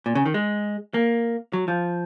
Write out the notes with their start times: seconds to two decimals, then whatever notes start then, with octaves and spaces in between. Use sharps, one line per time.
0.06 A#2
0.15 C#3
0.26 D#3
0.34 G#3
0.94 A#3
1.53 F#3
1.68 F3